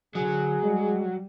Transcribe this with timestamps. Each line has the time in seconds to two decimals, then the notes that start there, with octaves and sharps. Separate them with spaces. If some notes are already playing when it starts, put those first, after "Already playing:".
0.15 D3 F#3 G#4
0.63 G3 G#3